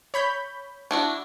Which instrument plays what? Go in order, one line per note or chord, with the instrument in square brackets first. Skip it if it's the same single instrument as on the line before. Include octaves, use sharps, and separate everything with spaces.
[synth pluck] C#5 B5 G6
[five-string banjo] D4 E4 F#4